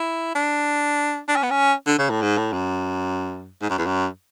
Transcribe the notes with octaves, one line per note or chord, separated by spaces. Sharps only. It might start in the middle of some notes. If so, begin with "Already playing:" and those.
Already playing: E4
D4
D4
C#4
B3
C#4
D3
C#3
A2
G#2
A2
F#2
G#2
F#2
E2
F#2